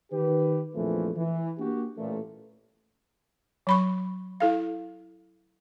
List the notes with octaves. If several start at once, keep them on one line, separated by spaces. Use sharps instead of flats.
D#3 G4 B4
A#1 F2 E3 F3 A3
E3
A#3 D4 F#4 G4
A1 A#2 A3
F#3 B5 C#6
E4 A4 F5